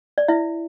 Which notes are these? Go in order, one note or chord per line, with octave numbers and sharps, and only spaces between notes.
D5
E4 E5